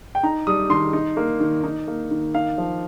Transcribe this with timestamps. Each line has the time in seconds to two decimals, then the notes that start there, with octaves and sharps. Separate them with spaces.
0.15 G5
0.23 D#4 A#5
0.47 G3 D#6
0.70 D#3 C6
0.93 D#4
1.17 A#3
1.40 D#3
1.64 D#4
1.87 A#3
2.11 D#3
2.34 D#4 F5
2.58 F3